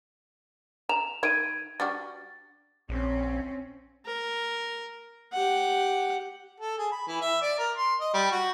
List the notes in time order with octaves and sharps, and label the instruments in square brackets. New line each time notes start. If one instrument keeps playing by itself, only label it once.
[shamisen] A#5 [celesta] E7 F7
[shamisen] D#3 E4 [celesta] G#6 D7 D#7
[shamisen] G3 D4 F#4 [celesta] A6
[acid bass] A#1 [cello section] C4 C#4
[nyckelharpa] A#4
G4 F#5
[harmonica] A4
G#4
B5
E3
E5
D5
A#4
C6
D#5
G3
F#4